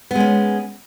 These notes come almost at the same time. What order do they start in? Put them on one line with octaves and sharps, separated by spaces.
B3 G#3 C#4